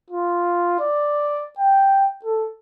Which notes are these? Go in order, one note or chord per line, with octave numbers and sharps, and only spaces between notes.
F4
D5
G5
A4